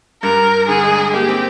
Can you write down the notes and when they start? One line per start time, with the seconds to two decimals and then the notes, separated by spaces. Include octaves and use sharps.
0.23 G2 A#4
0.68 D3 G#4
0.84 G#3
0.98 G#3
1.14 A#3 G4
1.29 C4